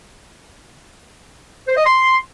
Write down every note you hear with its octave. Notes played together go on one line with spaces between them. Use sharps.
C5
D#5
C6